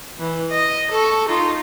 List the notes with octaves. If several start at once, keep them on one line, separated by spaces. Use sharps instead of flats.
E3
D#5
A4 C#6
D#4 F4